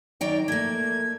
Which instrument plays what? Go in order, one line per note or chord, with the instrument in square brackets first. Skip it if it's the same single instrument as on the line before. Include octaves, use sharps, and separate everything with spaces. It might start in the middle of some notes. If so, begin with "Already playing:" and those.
[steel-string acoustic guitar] D#3 F#3 G5 [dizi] D5
[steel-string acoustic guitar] A3 A#3 [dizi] G#6